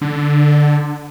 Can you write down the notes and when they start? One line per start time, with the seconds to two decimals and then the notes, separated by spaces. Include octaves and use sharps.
0.01 D3